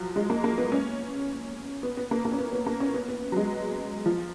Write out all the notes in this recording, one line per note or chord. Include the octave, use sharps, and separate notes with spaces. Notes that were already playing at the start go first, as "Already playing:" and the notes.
Already playing: F3 F#3
G#3
A#3
A#3
B3
C#4
B3
B3
A#3
A#3
C#4
B3
B3
A#3
C#4
B3
B3
F#3
G#3
F3